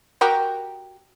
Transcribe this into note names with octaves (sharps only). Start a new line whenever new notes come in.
F#4 G4 A#4